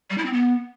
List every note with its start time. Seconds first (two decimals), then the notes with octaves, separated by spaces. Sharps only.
0.10 G3
0.18 E4
0.25 C4
0.33 B3